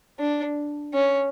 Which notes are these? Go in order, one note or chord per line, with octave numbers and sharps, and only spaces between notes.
D4
C#4